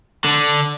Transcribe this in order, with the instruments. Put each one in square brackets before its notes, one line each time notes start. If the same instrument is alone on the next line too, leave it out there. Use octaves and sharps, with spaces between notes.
[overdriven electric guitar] D3